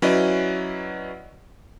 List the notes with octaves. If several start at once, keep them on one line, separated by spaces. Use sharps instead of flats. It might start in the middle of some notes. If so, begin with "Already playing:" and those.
F#3 C#4 E4 B4 D5 D#5